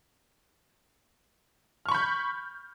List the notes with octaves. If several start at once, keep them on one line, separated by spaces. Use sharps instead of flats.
B5 C#6 F6 G6